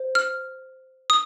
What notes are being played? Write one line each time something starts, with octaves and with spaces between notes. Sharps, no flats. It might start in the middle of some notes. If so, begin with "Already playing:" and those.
Already playing: C5
F6
D#6